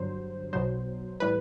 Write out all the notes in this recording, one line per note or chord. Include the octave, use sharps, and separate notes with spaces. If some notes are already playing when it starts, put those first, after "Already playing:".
Already playing: G1 G2 F#3 C5
B1 B2 F#3 C5
A2 E3 G3 B4